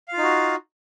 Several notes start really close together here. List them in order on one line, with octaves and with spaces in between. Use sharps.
F5 F4 D#4 F#4